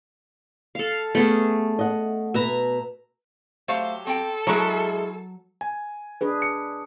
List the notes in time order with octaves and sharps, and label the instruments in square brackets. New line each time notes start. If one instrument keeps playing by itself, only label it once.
[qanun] A4 F5
[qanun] A3 C#4 G#4 [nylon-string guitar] B3
[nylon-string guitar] D#5 F#5
[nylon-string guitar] B2 B4 [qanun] E5 A#5
[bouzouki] F#3 G4 [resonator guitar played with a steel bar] A3 C5 F5
[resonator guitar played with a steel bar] C4 G5 [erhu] A4
[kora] F#3 F#4 [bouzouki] G#3 E5 [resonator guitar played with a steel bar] C#4 E4 A#4
[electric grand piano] G#5
[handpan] D4 G#4 B4
[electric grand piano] C#7